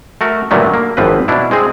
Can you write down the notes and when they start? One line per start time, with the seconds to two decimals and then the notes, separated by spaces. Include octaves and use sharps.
0.21 A3 F#4 A#4
0.51 G2 A#2 D3 D#3 F#3 A3
0.74 A#3
0.97 G#1 F#2 F3 C4 B4
1.28 B2 D4 E4
1.51 G#3 C4 G#4